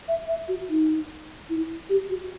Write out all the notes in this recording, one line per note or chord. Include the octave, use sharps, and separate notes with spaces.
E5
E5
F#4
D#4
E4
G4
F#4